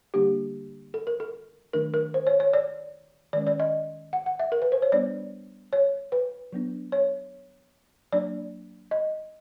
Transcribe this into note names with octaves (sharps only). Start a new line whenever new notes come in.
D3 G3 A#3 D4 G4
A4
A#4
A4
D#3 F#3 A3 D4 A#4
A#4
C5
C#5
C#5
D5
D#3 G#3 C#4 D5
D5
D#5
F#5
F#5
E5
A#4
B4
C5
C#5
G3 B3 D4 D5
C#5
B4
F#3 B3 D4
C#5
F#3 A#3 D4 D5
D#5